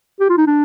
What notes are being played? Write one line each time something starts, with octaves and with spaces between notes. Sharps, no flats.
G4
F4
D#4
D4